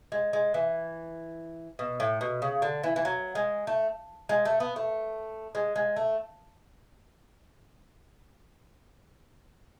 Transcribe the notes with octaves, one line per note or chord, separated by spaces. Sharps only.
G#3
G#3
E3
B2
A2
B2
C#3
D3
E3
E3
F#3
G#3
A3
G#3
A3
B3
A3
G#3
G#3
A3